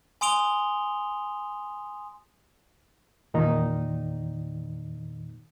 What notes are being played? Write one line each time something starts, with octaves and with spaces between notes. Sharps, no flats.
G#5 C6 D#6 D7 F7 G7
E2 A#2 D#3 D#4